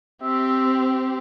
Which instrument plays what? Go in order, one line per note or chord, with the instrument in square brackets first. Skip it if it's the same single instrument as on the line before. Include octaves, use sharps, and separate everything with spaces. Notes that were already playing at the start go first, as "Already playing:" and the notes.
[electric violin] C4 G4 [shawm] E5